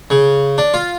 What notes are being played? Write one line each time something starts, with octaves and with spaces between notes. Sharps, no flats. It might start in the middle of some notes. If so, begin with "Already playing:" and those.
C#3
D4
F4